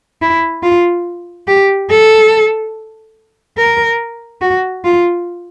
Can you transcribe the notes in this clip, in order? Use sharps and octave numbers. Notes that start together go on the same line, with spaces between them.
E4
F4
G4
A4
A#4
F#4
F4